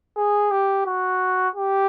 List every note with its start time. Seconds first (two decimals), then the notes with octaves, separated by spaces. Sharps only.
0.17 G#4
0.51 G4
0.86 F#4
1.56 G4